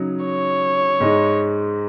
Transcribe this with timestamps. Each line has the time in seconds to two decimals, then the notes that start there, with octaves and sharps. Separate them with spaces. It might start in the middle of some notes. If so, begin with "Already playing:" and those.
Already playing: C#3 F#3 D#4
0.25 C#5
1.00 G#2 G#3 D#4